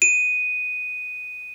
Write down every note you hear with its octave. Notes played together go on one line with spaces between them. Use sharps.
D#7